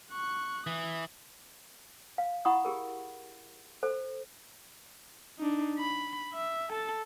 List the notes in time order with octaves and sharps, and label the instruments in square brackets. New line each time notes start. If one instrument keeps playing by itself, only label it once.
[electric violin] C#6 F#6
[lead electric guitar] E3 [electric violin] D#6
[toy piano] F5
E4 F#5 B5 C#6 D#6
G4 G#4 A#4
A4 C5
[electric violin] D4 D#4
B5
E5
A4 A5